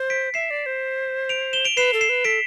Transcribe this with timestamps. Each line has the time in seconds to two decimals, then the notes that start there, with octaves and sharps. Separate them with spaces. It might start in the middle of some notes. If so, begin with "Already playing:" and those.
Already playing: C5
0.10 B6 D7
0.34 E5 C7 E7
0.50 D5
0.66 C5
1.29 D7 F7
1.53 E7 G7
1.65 D7 F7
1.77 B4 C7 E7
1.93 A4
2.01 C7 E7
2.09 B4
2.24 A4 B6 D7